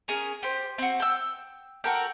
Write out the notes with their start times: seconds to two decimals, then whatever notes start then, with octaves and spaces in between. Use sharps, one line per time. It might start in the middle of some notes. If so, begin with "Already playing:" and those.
0.08 C#4 G#4 A#4
0.43 G4 C5
0.78 C4 F#4
1.00 G5 E6
1.84 F#4 A4 A#4 G5